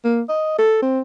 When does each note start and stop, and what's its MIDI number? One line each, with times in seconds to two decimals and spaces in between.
0.04 0.21 58
0.29 0.58 75
0.58 0.80 69
0.82 1.00 60